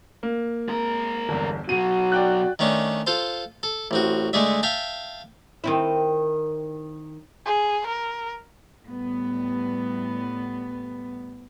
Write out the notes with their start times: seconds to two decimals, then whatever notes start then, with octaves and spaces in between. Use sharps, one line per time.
0.23 A#3
0.68 G#3 A#4
1.29 G1 E2
1.69 B2 F#3 F#4 D#7
2.12 D5 G5 F#6
2.59 D#3 A3 C#4 D4
3.07 F4 A4 C5
3.63 A4
3.91 A1 C4 F#4
4.33 D3 G#3 A3 G#4 D5 E5
4.63 E5 F5 G5 A5
5.64 D#3 C4 E4
7.46 G#4
7.86 A#4
8.85 A2 G3 B3